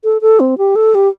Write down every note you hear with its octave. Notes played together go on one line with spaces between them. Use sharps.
A4
A4
C4
G4
A4
G4